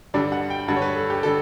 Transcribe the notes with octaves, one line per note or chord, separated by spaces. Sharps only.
G2 D3 G3 D5
F#5
G5
G2 D3 G3 F#5
C#5
B4
A4
G4
D3 G3 A4